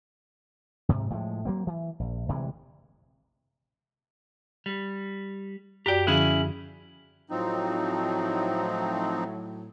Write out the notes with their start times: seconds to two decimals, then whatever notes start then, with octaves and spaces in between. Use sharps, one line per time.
0.89 G#2 C3
1.10 A2 F3 F#3 G#3
1.45 F#3 A#3 C4
1.67 E3
2.00 A#1
2.29 D2 C3 E3 G#3
4.66 G3
5.86 F#2 F#4 G4 D5 G5
6.07 D3 F3 C#4 E4 G#4
7.30 A2 F3 F#3 C4 D#4